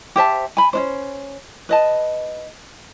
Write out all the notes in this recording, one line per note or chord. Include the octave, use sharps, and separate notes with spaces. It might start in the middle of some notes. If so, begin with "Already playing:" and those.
G4 C5 E5 A5
G#5 B5
C#4 D4 C5
B4 D#5 A5